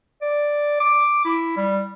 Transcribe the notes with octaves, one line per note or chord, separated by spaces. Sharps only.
D5
D6
E4
G3